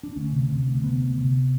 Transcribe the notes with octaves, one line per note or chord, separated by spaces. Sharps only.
D4
D2 C#4
C3
C3
D2
C3 B3
D2
C3